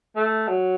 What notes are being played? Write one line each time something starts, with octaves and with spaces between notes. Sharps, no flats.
A3
F#3